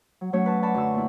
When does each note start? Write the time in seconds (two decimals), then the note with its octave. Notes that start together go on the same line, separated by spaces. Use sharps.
0.21 F#3
0.33 F#3 A3 C#4 C#5
0.46 B4 A5
0.62 D5 F#5 A5 B5 C#6
0.74 F#2 D3 E5 C#6 E6
0.94 A#2 E4